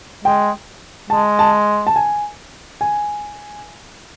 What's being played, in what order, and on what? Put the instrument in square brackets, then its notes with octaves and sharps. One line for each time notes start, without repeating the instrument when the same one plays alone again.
[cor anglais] G#3 [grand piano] G5
[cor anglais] G#3 [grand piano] A5
[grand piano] A5
A5
G#5
G#5